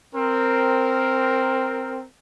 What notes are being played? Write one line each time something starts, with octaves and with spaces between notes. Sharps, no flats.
C4 A#4